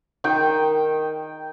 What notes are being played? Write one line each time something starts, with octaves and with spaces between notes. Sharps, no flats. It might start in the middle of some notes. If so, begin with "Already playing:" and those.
D#3 G5